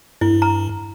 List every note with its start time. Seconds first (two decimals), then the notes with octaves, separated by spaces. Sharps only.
0.21 G2 E4
0.42 A#5